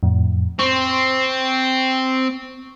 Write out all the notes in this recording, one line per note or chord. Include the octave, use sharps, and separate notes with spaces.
F2 A2
C4 C#6